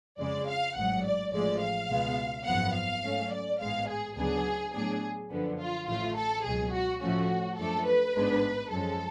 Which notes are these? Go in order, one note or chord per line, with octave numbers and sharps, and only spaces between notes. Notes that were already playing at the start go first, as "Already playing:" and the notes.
F2 C#3 G#3 D5
F5
A1 G#2 F#3 F#5
D5
A1 A2 F3 G#3 D5
F5
C#2 B2 G#3 B3
G#1 F#2 F3 B3 F#5
F5
G#2 F#3 A3 C#4
D5
A1 G#2 G#3 B3 F5
G#4
D2 C#3 F#3 B3 D4 G#4
A2 F#3 B3 D4 G#4
F#2 D3 F3 B3
F4
A1 A2 F3 A3 F4
A4
C#2 B2 F#3 G#4
F#4
A2 F3 A3 C#4 F#4
F#2 F3 A3 D4 A4
B4
A1 G#2 G#3 B3 D4
F#2 F3 G#3 C#4 A4